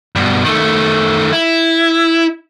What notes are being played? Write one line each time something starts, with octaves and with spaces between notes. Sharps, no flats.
G2 B2
D#3 A3
E4